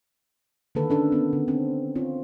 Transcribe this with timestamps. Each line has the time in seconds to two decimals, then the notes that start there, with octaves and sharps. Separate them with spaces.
0.75 D3 D#3 A#3 A4 B4
0.90 C#4 D4 A4
1.12 B3 C#4
1.33 D3
1.48 C4
1.95 C4 F4 C#5